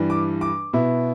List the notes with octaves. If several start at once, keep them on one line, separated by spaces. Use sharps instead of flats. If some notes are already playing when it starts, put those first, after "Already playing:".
Already playing: G2 E3 G3 D4
D6
D6
B2 B3 E4